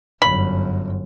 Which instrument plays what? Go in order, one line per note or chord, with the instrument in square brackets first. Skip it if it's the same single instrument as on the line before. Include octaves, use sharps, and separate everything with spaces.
[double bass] G1 F#2 [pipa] B5